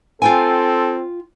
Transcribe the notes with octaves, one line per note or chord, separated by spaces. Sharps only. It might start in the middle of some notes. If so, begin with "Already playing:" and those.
C4 F4 A4 G5 G#5